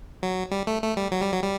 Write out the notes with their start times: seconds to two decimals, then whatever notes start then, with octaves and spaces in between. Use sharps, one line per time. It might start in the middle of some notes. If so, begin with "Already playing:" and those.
0.23 F#3
0.51 G3
0.67 A3
0.83 A3
0.97 G3
1.11 F#3
1.22 G3
1.32 F#3
1.42 G3